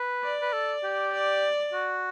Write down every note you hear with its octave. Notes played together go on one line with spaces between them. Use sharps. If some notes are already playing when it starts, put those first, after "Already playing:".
Already playing: B4
D5
B4
A4
G4
D5
F#4